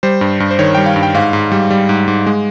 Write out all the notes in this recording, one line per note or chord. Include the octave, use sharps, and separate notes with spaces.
G3 C5
G2
G2
C5
D#3 C#5
G3 G5
F5
G2
G5
G#2 F5
G#2
G3
G3
G#2
G#2
G#3